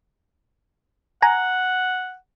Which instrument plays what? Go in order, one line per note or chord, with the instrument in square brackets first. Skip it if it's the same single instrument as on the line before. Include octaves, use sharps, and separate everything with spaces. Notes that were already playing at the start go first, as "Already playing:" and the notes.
[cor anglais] F#5 [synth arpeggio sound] G#5 A#5